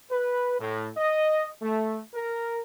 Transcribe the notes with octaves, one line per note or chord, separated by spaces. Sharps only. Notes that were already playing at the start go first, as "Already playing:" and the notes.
B4
A2
D#5
A3
A#4